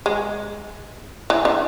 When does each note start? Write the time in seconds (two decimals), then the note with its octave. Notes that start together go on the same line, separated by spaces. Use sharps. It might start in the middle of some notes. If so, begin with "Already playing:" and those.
0.06 G#3
1.30 E3
1.45 D3